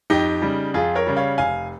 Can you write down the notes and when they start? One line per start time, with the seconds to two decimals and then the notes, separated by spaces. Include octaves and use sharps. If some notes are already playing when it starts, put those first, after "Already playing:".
0.10 F2 D#4 G4
0.42 C#3 G3
0.74 F2 F4 G#4
0.95 A#4 C#5
1.07 C#3 G3
1.16 C#5 F5
1.38 F1 F5 G#5